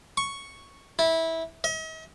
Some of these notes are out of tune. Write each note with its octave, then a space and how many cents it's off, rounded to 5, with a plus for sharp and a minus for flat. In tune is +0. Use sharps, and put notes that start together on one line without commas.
C#6 +0
E4 -15
D#5 +45